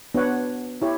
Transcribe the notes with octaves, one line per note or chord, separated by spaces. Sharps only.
B3 D4 F#4 C#5 F#5
E4 G4 C#5